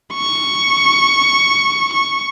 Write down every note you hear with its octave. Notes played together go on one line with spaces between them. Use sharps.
C#6
C#6